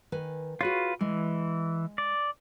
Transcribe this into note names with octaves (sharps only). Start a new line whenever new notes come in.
D#3 B4 G#5
F4 F#4 G#4 B4 C#5
E3 G#3
D5